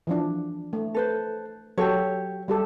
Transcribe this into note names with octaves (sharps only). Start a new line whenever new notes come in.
E3 F3 D4
A3
A4 B4 C5
F#3 G4 A4 C#5
G3 G4 A4